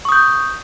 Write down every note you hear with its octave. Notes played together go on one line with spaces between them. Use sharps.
C#6 D#6 G6